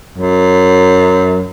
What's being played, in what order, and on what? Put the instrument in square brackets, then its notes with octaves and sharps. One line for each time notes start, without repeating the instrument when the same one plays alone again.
[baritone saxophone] F#2